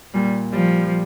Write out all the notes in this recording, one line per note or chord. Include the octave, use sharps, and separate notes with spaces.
A#2 G3
F3 G3